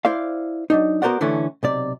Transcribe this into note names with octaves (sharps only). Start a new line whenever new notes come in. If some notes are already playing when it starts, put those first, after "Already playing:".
E4 C5 D5 F5
F#3 D4 D#4
B3 F#4 A#4 C5 D5 F#5
D3 E3 A3 C#4
B1 C3 D5